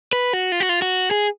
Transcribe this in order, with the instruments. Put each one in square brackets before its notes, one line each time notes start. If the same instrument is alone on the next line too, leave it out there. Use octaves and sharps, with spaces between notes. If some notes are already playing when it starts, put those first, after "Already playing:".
[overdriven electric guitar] B4
F#4
F4
F#4
F4
F#4
G#4